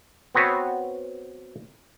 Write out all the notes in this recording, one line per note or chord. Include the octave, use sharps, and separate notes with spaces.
B3 C4 F#4 B4 C#5